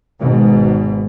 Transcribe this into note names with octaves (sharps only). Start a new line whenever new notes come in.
G#1 G#2 B2